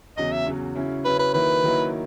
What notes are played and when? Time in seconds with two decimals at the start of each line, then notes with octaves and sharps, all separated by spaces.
0.17 E2 C#3 F#3 D#5
0.32 E5
0.46 E2 C#3 F#3
0.76 C#3 F#3 C#4 E4
1.05 C#3 F#3 C#4 E4 B4
1.19 B4
1.34 D#3 F#3 A#3 E4 B4
1.63 D#3 F#3 A#3 E4